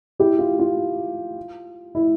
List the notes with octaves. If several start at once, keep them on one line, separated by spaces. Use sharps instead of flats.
E4 G4
F4
F4
E4